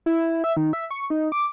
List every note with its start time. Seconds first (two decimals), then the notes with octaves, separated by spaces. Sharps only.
0.06 E4
0.44 E5
0.57 D#3
0.73 E5
0.91 C#6
1.10 D#4
1.32 D6